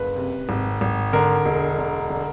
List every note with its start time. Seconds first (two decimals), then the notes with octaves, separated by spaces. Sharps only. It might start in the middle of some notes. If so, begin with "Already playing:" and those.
Already playing: F#1 B4
0.16 C3
0.49 G#1
0.81 G#1
1.13 D3 A#4
1.45 E1
1.78 D3
2.10 D3